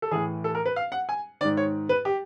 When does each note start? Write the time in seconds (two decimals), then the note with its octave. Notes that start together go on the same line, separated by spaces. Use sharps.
0.02 A4
0.11 A2 E3 G#4
0.44 A4
0.55 A#4
0.65 B4
0.76 F5
0.92 F#5
1.09 G#5
1.41 D#3 D5
1.44 G#2
1.57 C#5
1.89 B4
2.05 G4